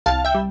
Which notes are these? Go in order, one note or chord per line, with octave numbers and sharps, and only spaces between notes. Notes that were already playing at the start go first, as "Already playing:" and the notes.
C2 F5 A5
E5 G5
G3